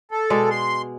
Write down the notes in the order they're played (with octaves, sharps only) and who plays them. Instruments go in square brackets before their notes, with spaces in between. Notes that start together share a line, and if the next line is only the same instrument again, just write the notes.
[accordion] A4
[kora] B2 G#3 D5
[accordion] C6